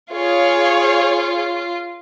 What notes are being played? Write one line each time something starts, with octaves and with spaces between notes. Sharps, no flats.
F4 G#4 C#5 F5